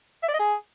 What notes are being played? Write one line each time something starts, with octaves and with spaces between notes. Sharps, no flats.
E5
D5
D#5
G#4